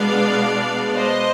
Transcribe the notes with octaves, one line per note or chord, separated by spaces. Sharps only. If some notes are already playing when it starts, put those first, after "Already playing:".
Already playing: B2 G#3 B3 D4 D5 F5
C5 D#5